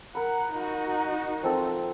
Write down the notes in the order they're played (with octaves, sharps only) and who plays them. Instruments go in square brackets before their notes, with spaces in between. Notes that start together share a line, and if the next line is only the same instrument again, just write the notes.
[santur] A#4 B5 [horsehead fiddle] F#5
[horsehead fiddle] D#4 F#4
[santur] F3 C4 A4